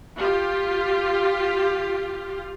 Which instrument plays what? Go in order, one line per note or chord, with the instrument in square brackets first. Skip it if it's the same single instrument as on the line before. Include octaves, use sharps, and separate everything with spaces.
[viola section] F4 G4